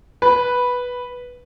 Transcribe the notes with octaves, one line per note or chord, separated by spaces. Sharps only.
B4